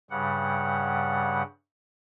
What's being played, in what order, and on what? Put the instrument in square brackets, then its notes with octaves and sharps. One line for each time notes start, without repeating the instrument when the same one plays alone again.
[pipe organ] G2 C#3 G3 F#5